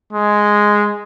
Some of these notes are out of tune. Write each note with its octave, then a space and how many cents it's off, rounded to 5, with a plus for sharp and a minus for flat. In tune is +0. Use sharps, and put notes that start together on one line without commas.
G#3 +0